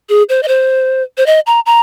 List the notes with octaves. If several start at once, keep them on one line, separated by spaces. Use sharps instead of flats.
G#4
C5
D#5
C5
C5
D#5
A#5
A#5